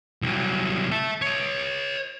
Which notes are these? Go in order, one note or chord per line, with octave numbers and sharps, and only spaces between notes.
C2 F#3
E5 A5
C#5 D#5